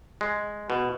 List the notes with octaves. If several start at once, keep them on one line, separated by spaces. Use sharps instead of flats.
G#3
B2